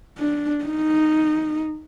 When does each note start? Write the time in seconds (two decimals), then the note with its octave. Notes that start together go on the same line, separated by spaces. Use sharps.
0.19 D4
0.64 D#4